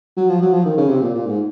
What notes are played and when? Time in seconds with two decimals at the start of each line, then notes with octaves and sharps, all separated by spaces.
0.17 F#3
0.30 F3
0.42 F#3
0.53 F3
0.66 D#3
0.78 C#3
0.90 C3
1.02 A#2
1.14 A#2
1.26 G#2